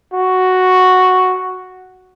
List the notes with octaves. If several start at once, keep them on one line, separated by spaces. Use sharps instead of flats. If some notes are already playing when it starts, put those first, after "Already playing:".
F#4